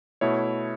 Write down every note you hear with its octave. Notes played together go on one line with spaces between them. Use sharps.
B2 A3 E4 C#5